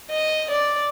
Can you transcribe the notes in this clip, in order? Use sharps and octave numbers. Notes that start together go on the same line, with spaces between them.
D#5
D5